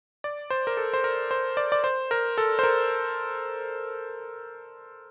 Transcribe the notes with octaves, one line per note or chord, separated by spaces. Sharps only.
D5
C5
A#4
A4
C5
A#4
C5
D5
D5
C5
A#4
A4
C5
A#4